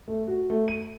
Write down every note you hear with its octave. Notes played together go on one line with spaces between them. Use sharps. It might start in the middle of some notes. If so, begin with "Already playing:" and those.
A3
F#4
A3
D#7